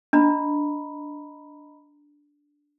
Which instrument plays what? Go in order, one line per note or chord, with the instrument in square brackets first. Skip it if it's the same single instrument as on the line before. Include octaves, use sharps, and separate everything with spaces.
[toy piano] D4 [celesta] D#5 A#5 B5